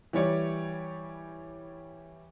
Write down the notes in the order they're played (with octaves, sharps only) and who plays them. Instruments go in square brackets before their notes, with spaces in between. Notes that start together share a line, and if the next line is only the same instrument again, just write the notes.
[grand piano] E3 G3 G4 C#5 D5